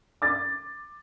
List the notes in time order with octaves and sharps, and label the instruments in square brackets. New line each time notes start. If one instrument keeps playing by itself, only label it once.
[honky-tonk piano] D6 A6